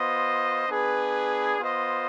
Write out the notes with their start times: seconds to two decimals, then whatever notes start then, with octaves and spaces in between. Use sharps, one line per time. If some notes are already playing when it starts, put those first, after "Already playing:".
Already playing: B3 F4 C5 D#5
0.67 B3 D4 G#4 B4
1.59 B3 F4 C5 D#5